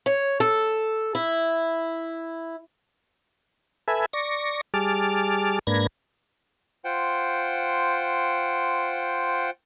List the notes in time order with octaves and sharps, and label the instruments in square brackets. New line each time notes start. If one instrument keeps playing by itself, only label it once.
[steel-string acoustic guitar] C#5
A4
E4
[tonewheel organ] A4 B4 E5 G#5
D5 C#6 A#6
G3 G#4 A5 D6 F6
G#2 A#3 D4 B4 G#6 A#6
[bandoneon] F4 C5 F#5 G5